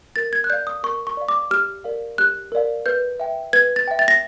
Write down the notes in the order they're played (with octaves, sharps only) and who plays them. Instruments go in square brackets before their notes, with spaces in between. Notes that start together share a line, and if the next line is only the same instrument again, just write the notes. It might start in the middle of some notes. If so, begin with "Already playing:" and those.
[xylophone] A#4 A6
G#6
F#6
D5 F5 G6
D#6
A#4 C#6
C#6
D5 F5
D6
G4 F6
A#4 D5 F5
G4 F#6
A#4 D5 F5
B4 G6
E5 G5
B4 G#6
A6
E5 G5
A6
A#6